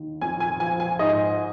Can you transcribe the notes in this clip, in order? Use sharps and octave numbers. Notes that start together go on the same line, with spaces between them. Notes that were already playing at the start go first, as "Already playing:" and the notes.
Already playing: D#2 D#3
F2 G#5
G#5
F3 G#5
G#5
G#2 D#5